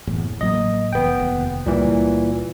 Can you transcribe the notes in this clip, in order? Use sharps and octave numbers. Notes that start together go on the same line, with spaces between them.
F#1 E2 A2
A1 F#3 A#3 D#5
F1 E2 B3 G5
F1 D#2
C#2 A#2 E3 G3